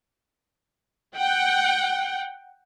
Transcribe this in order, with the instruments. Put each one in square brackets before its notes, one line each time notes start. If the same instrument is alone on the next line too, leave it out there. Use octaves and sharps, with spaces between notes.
[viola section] F#5 G5